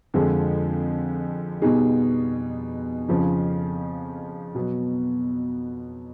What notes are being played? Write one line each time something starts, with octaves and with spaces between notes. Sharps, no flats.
F2 D3 F3 G#3
B2 G3 B3 D#4 G#4
F2 C#3 F3
B2 F#3 B3